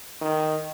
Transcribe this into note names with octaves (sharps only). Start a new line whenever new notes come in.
D#3